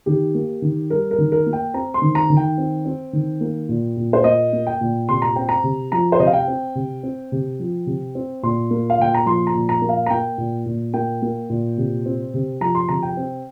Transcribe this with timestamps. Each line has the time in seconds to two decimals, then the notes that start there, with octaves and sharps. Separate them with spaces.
0.06 D#3 G4
0.35 A#3
0.62 D#3
0.90 G3 A#4
1.11 A#4
1.18 D#3
1.32 A#4
1.46 A#3
1.53 G5
1.74 C4 A#5
1.94 C6
2.02 D#3
2.15 A#5
2.30 D#3
2.37 G5
2.58 C4
2.86 C4
3.13 D#3
3.41 A#3
3.69 A#2
3.97 A#2
4.13 C5
4.24 A#3 D#5
4.53 A#3
4.67 G5
4.81 A#2
5.09 C3 C6
5.22 A#5
5.36 C4 G5
5.49 A#5
5.64 C3
5.92 F3 A#5
6.12 C5
6.19 C3 D#5
6.27 F5
6.33 G5
6.48 C4
6.75 C3
7.03 C4
7.32 C3
7.60 F3
7.87 C3
8.15 C4
8.43 A#2 C6
8.71 A#3
8.90 F5
8.99 A#2 G5
9.14 A#5
9.26 F3 C6
9.47 A#5
9.55 A#2
9.69 A#5
9.82 A#3
9.89 F5
10.06 A#5
10.10 A#3 G5
10.38 A#2
10.66 A#2
10.94 A#3 G5
11.22 A#3
11.50 A#2
11.78 C3
12.06 C4
12.34 C3
12.61 F3 A#5
12.75 C6
12.89 C3 A#5
13.03 G5
13.17 C4